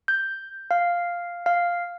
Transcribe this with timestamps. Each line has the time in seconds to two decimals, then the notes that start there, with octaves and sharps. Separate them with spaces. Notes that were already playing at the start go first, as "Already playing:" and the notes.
0.08 G6
0.71 F5
1.46 F5